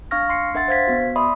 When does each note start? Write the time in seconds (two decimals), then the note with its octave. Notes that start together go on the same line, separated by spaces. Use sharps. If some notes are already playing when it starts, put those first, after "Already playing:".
0.11 D4 F5 C#6 F6 A#6
0.29 C6 C7 C#7
0.55 D4 A#4 E5 F#5 C6 A6
0.68 C5 F5 G#6 B6
0.88 B3 F#4
1.16 D5 E5 B5 C6 D#6